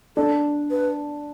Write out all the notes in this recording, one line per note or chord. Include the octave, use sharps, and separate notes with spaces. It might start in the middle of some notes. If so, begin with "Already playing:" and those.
D4 A4
B4